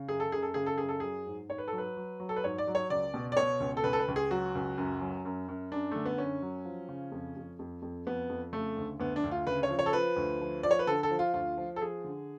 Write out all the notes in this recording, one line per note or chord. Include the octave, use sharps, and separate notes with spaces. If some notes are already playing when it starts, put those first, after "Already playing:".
Already playing: C#3
F#2 G#4
A4
F#2 G#4
A4
C#3 G#4
A4
F#2 G#4
A4
F#3 G#4
G#2
G#2 C#5
B4
A4
F#3
B4
F#3
F#3
A4
B4
G#2 C#5
D5
F#3
C#5
C#2 D5
B2
D5
B2 C#5
C#2
A4
C#2 B4
A4
B4
C#2
G#4
F#3 F#4
C#2
F#2
F#3
F#2
F#2
F#2 D4
D3 A3
B3
F#2 C#4
F#3
F3
C#3
F2
F2
F2
F2
F2 B3
F2
C#3 A3
D2
D2 B3
D4
D2
F4
C#3 B4
C#5
F3
C#5
A4
F3 B4
D2
F3
F3 D5
C#5
B4
D3 A4
A4
F3
F4
D2 F4
F3
A4
F3 G#4
D3